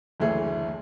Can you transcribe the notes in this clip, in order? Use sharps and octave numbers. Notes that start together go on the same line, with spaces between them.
F#1 D2 E3 A3 G#4